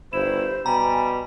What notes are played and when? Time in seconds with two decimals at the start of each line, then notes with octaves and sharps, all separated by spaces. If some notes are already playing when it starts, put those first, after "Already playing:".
0.13 G1 E4 C5 E7
0.66 B2 G3 G#5 A#5